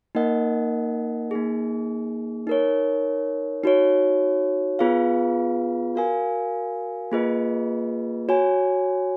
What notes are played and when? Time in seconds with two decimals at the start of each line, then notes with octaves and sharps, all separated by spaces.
0.15 A#3 D#4 A#4 D#5 F#5
1.31 A#3 D#4 G#4
2.47 D#4 A#4 C#5
3.64 D#4 F#4 C#5
4.79 B3 F4 G#4 B4 F5
5.95 F#4 A#4 F5 G#5
7.12 A#3 F4 G#4 B4 D#5
8.29 F#4 C#5 G#5